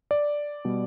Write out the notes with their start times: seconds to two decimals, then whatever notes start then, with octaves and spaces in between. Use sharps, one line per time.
0.11 D5
0.65 B2 G3